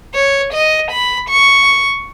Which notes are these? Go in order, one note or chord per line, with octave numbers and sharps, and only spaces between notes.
C#5
D#5
B5
C#6